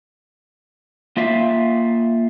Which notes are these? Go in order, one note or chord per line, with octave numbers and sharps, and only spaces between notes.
A#3 F4 E5 F5